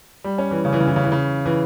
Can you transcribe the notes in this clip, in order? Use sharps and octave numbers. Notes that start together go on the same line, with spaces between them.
G3
C#4
E3
C#3
E3
C#3
E3
C#3
E3
C#3
E3